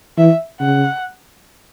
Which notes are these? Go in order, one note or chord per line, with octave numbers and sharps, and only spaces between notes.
E3 E5
C#3 F#5